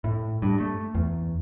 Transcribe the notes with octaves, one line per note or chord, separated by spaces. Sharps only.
A2
G2
A3
E2